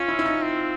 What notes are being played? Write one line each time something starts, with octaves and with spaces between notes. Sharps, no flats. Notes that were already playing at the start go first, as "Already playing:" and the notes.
Already playing: C#4 F4
E4
E4
D#4
C4